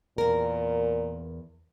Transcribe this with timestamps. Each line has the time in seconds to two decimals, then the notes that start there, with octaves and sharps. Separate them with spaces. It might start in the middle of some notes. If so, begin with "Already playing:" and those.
0.18 E2 A#2 A#4